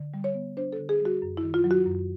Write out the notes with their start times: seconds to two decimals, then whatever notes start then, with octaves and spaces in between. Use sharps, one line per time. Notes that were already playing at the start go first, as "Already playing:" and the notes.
Already playing: D3
0.14 G3
0.24 C#5
0.34 B3
0.57 D4 C5
0.73 A4
0.79 D3
0.89 G#4
1.00 G3
1.05 F#4
1.22 F#2
1.37 E4
1.44 D#3
1.54 F4
1.64 F#3
1.71 F#4
1.86 F#2